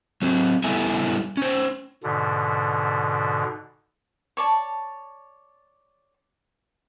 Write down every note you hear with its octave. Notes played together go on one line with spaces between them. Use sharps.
F#3 C4
G3 B3 E4 A4 E5 G#5
C#4 C5
G#2 B2 D3
C#5 D5 A5